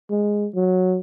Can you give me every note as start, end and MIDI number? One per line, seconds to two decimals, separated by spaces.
0.10 0.47 56
0.55 0.99 54